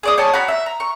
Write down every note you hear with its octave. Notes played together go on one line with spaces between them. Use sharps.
G#4 D5 D#6
C#5 D#5 G#5 A5
F#4 A#5 B5
E5
A#5
C#6